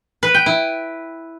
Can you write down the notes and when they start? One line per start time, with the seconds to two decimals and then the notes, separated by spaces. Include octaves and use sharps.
0.23 B4
0.34 G5
0.46 E4